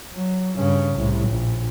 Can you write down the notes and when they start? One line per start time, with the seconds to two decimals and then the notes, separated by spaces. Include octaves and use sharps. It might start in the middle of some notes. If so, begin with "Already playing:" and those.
0.15 F#3
0.56 G2 C#3
0.95 C2 A2
1.29 A#1